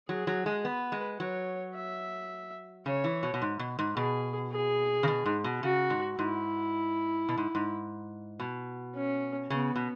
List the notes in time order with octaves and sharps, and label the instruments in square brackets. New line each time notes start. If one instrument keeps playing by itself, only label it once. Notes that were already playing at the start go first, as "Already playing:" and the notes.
[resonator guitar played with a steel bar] F#3 [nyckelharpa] G#4
[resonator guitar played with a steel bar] F#3
G#3
[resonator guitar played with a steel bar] B3 [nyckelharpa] B4
[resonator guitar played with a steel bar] G#3
[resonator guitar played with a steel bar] F#3 [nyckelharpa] C#5
[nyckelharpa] E5
[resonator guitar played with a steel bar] C#3 [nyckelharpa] C#5
[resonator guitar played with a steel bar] E3
B2
B2
G#2
B2
G#2
[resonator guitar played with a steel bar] B2 [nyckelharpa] G#4
[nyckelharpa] G#4
[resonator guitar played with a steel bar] C#3
B2
G#2
B2
[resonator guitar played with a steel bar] C#3 [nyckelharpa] F#4
[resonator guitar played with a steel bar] G#2
[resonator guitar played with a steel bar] G#2 [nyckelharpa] E4
[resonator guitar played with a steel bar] B2
G#2
G#2
B2
[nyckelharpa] C#4
[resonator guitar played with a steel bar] C#3 [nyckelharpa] B3
[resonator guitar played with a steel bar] B2